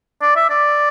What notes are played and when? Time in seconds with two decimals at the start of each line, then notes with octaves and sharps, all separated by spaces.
0.21 D5
0.36 E5
0.49 D5